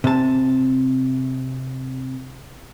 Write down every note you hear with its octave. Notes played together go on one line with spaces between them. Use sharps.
C3 A5